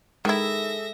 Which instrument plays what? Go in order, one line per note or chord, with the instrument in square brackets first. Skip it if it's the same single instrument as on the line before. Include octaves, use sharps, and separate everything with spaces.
[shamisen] D#3 E4 [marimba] G#3 [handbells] G#4 A4 [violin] E5 A#6